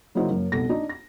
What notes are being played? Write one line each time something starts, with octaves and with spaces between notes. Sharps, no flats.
C#3 F#3 A#3 D#4 E4 C5
F#2 A#3
F1 C2 B2 B3 A4 A#6
D4 D#4
A#6